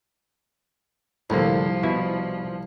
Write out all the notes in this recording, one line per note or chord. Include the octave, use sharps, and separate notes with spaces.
C2 A2 D3 F3 A#3
B2 E4